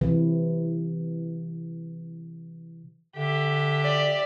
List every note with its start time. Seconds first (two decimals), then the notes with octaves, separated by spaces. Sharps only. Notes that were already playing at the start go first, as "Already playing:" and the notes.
0.01 C3 E3
3.17 D3 G4 E5
3.84 D5